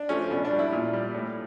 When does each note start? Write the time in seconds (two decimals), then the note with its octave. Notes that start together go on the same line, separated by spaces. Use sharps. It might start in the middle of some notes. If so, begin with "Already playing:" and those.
Already playing: D4
0.09 F3 A3 C#4
0.30 B2 D4
0.45 D4
0.51 G3
0.59 E4
0.72 A#2
0.93 G3
1.14 A2